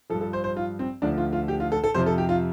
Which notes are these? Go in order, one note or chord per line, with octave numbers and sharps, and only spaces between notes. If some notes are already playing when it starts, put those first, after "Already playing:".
G2 F3 A4
A4
C5
C5
F4
C4
D2 D3 F3 D4
F4
F4
G4
F4
A4
A4
F2 C3 F3 C5
A4
G4
F4